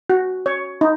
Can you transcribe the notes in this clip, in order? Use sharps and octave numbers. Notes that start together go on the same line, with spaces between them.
F#4
C#5
D#4